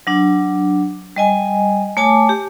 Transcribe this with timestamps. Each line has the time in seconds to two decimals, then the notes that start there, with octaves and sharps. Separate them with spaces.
0.07 F#3 D4
1.16 G3 D#5 G#5
1.97 A3 C#5 G#5 A5 D6
2.29 G4